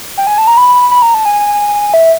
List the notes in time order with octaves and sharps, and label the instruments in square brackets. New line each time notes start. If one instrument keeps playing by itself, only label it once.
[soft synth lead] G5
G#5
A5
A#5
B5
B5
A#5
A5
G#5
E5